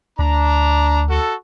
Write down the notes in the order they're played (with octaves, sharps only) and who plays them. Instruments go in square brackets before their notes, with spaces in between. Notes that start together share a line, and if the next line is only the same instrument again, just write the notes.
[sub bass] D2 [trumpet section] D4 A#5
[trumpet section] F#4 A4